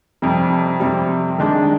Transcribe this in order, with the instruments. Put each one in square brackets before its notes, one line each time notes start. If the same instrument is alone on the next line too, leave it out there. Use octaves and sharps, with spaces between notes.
[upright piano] F2 C3 G3
F2 C3 G3
D#3 G#3 D4